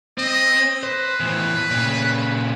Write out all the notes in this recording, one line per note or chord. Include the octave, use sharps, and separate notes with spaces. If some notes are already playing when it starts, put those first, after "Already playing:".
C4 D#5
B4 C5
E2 A2
A#2 C#3